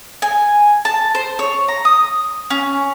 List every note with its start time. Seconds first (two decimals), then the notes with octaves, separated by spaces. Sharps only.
0.22 G#5
0.85 A5
1.15 C5
1.39 C#5
1.68 A#5
1.85 D#6
2.50 C#4